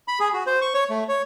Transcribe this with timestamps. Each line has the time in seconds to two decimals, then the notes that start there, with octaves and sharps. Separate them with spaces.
0.08 B5
0.20 G#4
0.33 F#4
0.47 C5
0.61 C#6
0.74 C#5
0.90 A3
1.09 C#5